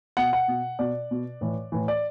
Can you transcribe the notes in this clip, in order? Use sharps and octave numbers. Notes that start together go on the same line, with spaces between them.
B2 F#5
F#5
B2
B2 D5
B2
A2 E3
A2 E3
D5